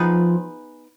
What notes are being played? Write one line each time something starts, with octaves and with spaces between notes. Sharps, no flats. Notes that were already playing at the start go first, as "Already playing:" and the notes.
Already playing: F3 B3 D#4 F4 G#4 B4